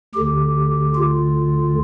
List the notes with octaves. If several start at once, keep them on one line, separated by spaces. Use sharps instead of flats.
D2 D3 G4
F4